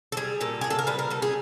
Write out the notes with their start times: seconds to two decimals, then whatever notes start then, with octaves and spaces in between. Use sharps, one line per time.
0.12 A4
0.17 G3 G#4
0.41 A#2 A4
0.61 A#2 G#4
0.70 A4
0.79 A#4
0.87 G3 B4
0.99 A#4
1.10 G3 A4
1.22 G#4